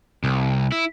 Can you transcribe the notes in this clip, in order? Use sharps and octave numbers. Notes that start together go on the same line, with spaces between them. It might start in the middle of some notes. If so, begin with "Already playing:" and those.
C2
E4